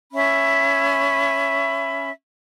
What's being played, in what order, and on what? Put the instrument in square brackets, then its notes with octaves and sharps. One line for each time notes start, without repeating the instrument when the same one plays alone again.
[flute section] C#4 E5 B5